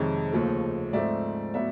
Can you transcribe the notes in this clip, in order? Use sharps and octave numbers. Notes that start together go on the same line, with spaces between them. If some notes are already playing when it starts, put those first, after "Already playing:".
Already playing: F2 C3 D#3 G#3 C4 C#5 D#5
D#2 C#3 F3 A3
G#2 F3 A3 C4 D5 E5
A2 F#3 B3 D5 E5